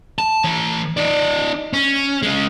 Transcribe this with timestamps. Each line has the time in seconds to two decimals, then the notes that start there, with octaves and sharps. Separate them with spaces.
0.19 A5
0.44 E3 C#5
0.97 D#4 D5
1.73 C#4
2.22 G#3 C#4